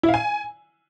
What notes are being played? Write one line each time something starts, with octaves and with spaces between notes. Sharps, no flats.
E4
F5
G#5